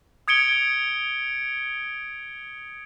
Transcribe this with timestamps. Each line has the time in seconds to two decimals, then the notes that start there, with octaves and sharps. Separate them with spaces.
0.28 D#6 G#6 C#7 D7 G7